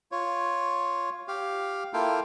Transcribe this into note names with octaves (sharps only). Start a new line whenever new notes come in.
F4 C#5
G4 F5
A#3 E4 F4 A4 F5 G5